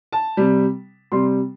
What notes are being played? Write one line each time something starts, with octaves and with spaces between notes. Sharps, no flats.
A5
C3 G3
C3 G3 C6